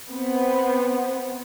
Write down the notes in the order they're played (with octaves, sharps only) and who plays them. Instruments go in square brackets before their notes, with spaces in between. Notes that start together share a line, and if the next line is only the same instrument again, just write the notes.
[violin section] B3 C4